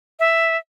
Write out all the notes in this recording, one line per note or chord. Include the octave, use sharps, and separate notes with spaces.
E5